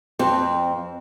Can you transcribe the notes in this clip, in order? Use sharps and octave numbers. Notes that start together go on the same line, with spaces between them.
F2 C4